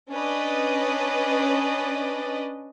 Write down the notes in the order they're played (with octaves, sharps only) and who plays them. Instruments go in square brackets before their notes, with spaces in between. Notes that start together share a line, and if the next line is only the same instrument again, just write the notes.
[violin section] C#4 D4 B4 D5 D#5